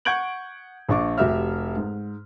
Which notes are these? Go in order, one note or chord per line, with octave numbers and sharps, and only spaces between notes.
F#5 C#6 G6 G#6 D7 F#7
A#1 D4 C#6 D6
F1 F#4 G4 E5 F6
G#2